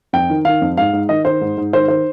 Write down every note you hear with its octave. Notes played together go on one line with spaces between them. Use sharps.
F2 G5
D#3
D#3 F5
F2
G#2 F5
G#2
D#3 D#5
D#3 C5
G#2
G#2
D#3 C5
D#3 C5